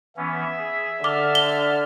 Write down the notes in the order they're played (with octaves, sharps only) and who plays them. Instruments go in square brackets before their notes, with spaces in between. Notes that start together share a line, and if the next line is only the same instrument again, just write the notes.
[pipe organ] E3 B3 C#4 [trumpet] E5
[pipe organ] G#4
[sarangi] D3 [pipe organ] A5 F6 [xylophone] D6
[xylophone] G7